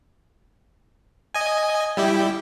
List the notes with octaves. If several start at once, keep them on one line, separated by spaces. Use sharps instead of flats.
D#5 G#5
G3 E4 G4